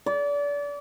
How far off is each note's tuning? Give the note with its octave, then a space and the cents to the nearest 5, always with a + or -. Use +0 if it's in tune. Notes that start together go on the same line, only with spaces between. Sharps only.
D5 -30